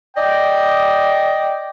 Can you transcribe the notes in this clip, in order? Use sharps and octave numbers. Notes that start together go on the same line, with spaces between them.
D5 D#5 G5